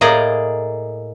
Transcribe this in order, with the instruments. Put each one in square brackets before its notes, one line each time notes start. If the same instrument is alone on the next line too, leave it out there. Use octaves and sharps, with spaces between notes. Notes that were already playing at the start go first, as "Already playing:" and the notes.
[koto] A2 A#3 G#4 D5 D#5 A#5